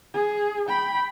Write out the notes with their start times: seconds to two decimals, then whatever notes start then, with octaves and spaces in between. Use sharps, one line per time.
0.14 G#4
0.69 G5 B5